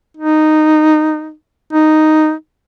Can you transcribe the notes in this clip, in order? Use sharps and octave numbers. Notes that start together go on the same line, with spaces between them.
D#4
D#4